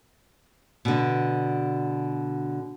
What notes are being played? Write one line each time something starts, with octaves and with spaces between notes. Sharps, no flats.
B2 D3